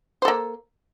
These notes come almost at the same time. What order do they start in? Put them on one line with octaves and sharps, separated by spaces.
C5 A4 A#3